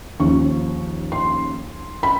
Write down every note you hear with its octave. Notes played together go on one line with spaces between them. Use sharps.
D#2 C#3 F3 C#6
C6
B5